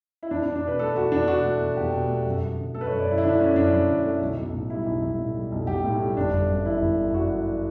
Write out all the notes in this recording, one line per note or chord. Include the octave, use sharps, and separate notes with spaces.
E4
E2 D4
D4
E2
D4
B2 B4
A3 A4
E2 F#4
E2 D4
B2 F#4
A3
E2
E2 G4
B2
A3
F#2
F#2
D3
A3 A4
B4
C#5
F#2
D5
F#2 E4
E4
D3 D4
A3 C#4
F#2 D4
F#2
D3
A3
B1
B1
A2
G3 E4
B1
B1
A2
G3
B1
B1 G4
A2
G3
G1 D4
G1
F#2
E3 E4
G1
G1
F#2 F#4
E3